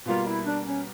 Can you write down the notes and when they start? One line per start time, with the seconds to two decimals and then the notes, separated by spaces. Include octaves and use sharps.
0.06 B2 G3 A#3 F4
0.25 E4
0.45 D4
0.66 C#4